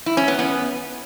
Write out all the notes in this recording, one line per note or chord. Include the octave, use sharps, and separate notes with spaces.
E4
C#4
B3
B3